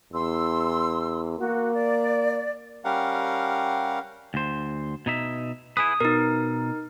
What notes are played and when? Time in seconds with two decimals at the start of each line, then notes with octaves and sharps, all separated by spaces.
0.13 E2 C6 E6
1.39 A#3 F#4
1.74 D5
2.85 G3 C#4 G4 A#4 F5 F#5
4.34 D2 C5
5.06 B2 D#4 E5
5.77 E4 G#4 B4 D#6
6.00 B2 D#4 A#4